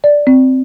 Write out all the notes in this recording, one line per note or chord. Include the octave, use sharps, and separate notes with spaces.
D5
C4